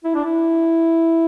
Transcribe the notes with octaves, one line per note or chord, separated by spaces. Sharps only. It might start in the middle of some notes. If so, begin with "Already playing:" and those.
E4
D4
E4